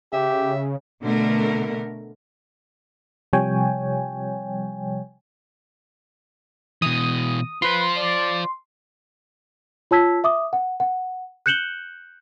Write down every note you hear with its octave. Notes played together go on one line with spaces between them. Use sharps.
C#3 G4 E5
B2 D3 A3 A#4
C3 F3 G3 C#5 G5 G#5
B2 E3 D#6
F4 B4 C5 C6
D5
F4 C#5 A5 E6 G#6 B6
E5 D6 D#6
F#5
F#5
F#6 G6 C#7 E7 F#7 G7